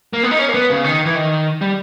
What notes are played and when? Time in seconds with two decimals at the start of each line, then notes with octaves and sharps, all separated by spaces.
0.13 A#3
0.23 B3
0.31 D#4
0.39 C#4
0.49 A#3
0.54 B3
0.70 C#3
0.84 D#3
1.05 E3
1.15 D#3
1.61 G3